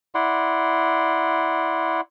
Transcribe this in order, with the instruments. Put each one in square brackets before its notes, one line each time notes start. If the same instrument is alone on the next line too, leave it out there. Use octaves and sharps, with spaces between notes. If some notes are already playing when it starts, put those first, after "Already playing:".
[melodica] E4 D5 F#5 C6